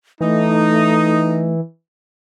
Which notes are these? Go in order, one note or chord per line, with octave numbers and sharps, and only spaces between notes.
E3 A3 D#4